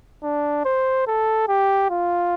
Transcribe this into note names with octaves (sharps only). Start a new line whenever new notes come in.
D4
C5
A4
G4
F4